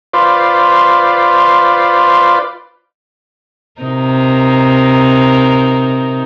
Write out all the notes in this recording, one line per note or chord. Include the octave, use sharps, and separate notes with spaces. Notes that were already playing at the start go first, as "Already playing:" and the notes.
F4 B4 C5 D5
C3 D#4 A#4